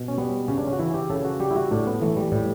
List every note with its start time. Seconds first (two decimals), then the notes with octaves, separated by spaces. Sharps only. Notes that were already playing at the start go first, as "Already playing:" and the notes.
Already playing: B2
0.08 C#4
0.18 G3 B3
0.48 C#3 C#4
0.58 D4
0.67 C#4
0.73 F#4
0.79 E3 E4
0.94 G4
1.10 C#3 A4
1.25 F#4
1.40 G3 G4
1.51 E4
1.56 F#4
1.71 A2 D4
1.87 B3
2.01 E3 A3
2.17 G3
2.32 A2 G3